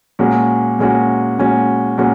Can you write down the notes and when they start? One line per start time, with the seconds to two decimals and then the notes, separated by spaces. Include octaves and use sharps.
0.19 A#2 G#3 C#4 F#4
0.79 A#2 G#3 C#4 F#4
1.39 A#2 G#3 C#4 F#4
1.98 A#2 G#3 C#4 F#4